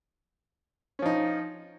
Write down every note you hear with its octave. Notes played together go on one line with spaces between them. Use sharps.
F3 C#4 D#4